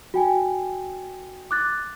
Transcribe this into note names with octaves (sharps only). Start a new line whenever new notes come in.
F#4 G5 G#5
D6 F#6 A6